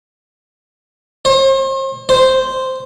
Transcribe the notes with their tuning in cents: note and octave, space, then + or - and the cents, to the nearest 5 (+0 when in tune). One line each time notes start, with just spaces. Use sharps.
C5 +40
C5 -5